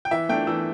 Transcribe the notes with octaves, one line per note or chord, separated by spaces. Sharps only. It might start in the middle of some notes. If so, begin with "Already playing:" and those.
G5
E3 E5
A3 D4 G5
E3 E6